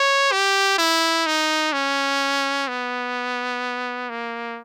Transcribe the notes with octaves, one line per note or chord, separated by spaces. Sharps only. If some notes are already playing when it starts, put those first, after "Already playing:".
Already playing: C#5
G4
E4
D#4
C#4
B3
A#3